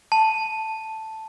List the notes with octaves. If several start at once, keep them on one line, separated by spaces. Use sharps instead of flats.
A5